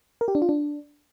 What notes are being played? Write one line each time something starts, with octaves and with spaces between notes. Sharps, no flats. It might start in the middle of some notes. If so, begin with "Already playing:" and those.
A#4
G4
D4
F4
D4